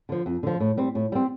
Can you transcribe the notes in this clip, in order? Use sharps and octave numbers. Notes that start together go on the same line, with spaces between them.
D3 F3
F2
D3 F3
A2
G3 C4
A2
G3 C4